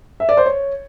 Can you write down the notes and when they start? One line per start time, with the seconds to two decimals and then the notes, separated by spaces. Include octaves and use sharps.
0.20 E5
0.29 D5
0.37 C5
0.46 C#5